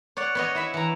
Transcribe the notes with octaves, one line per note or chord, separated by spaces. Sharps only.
C#5 D5 F#5
B3 C#5 D#5
E4 E5 B5
E3 A#5